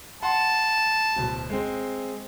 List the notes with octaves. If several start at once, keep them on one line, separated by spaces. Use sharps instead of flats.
F#5 A5 C6
D1 B2
G#3 C4